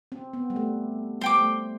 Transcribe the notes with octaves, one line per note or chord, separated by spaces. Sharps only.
C4
B3
G3
A3
G3 C5 G5 D6
A3